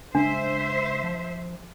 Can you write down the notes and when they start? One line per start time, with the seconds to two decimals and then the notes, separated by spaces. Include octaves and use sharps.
0.15 C#3 G#3 D4 C5 E5
1.04 F3